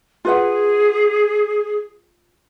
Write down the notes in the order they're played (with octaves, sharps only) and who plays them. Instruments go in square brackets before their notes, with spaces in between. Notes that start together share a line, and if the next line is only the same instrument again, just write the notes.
[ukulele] F4 B4 F#5 [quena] G#4